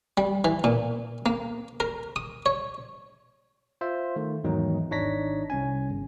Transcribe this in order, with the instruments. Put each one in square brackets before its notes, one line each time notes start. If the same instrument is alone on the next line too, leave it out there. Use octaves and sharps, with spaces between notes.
[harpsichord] G3
E3
A#2
A#3
A#4
D#6
C#5
[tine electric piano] F4 C5 E5
D#3 A3
E2 G#2 D#3 F#3 D#4
G#1 D4 D#4 C#5 A#6 B6
C2 C#4 G#5
G1